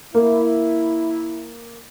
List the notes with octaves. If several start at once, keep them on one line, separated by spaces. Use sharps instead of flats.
A#3 E4